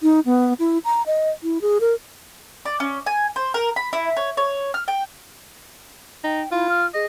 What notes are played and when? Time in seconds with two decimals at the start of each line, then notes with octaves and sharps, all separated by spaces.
0.03 D#4
0.26 B3
0.59 E4
0.85 A#5
1.07 D#5
1.43 E4
1.62 G#4
1.81 A#4
2.65 D5
2.80 C#4
3.06 G#5
3.36 C5
3.54 A#4
3.76 B5
3.93 E4
4.17 C#5
4.37 C#5
4.74 F6
4.88 G5
6.24 D#4 G5
6.52 E4 F4
6.69 F6
6.94 G#4 D#5